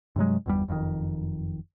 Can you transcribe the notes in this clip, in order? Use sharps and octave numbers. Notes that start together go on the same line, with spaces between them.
G2 C3 F#3 G#3
G1 E2 G3
F#1 F2 A#2 D#3